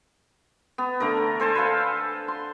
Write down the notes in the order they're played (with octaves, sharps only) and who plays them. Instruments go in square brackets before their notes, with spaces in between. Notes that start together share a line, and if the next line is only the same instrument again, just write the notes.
[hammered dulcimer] B3
D3 A3 A#4
A4 C5 G#5 A5
B4 C5 F5 A5
C6